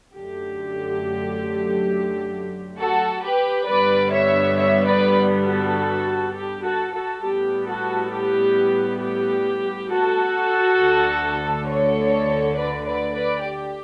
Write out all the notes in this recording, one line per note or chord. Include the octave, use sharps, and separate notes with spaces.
F#2 D3 F#3 A3 G4
F#4 A4
G4 B4
G2 D3 G3 B3 B4 D5
C#5 E5
C#5 E5
B4 D5
F#4 A4
G4
F#4 A4
F#4 A4
A2 G3 B3 G4
F#4 A4
G4
G4
F#4 A4
D2 D3 A3
A4 C#5
B4 D5
B4 D5
B4 D5
G4